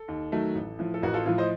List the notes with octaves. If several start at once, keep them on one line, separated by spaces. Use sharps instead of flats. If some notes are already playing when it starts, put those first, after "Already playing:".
Already playing: A4
D#2
D#3 F#3 A3
A1
A2 F3
A4
A1 F#4 A#4
F4 A4
A2 F3 F4 A4
C5 D#5